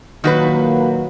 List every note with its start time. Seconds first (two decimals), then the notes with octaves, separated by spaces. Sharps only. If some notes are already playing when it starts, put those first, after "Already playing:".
0.24 A#2 D#3 F#3 A#3 F#4 B4